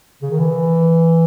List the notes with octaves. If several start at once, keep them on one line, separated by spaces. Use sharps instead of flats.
C#3
D#3
E3